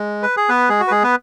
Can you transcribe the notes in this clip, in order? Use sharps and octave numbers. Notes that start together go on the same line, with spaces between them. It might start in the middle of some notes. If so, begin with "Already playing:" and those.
Already playing: G#3
B4
G#4
B3 B4
G#3 G#4
F#4
B4
G#3 G#4
B3 B4